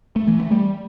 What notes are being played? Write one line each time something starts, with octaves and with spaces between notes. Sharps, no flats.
A3
E3
A3
G3